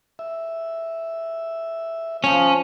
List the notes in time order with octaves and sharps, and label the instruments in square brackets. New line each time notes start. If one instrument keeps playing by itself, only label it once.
[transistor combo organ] E5
[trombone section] F3 [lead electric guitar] C#4